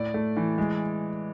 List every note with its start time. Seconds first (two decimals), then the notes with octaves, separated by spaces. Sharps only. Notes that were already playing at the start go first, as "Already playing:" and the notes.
Already playing: A2 D5
0.14 A3
0.37 E3
0.58 G#3